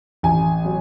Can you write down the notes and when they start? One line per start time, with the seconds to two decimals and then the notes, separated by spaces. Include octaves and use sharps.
0.23 A1 G#5
0.65 F#3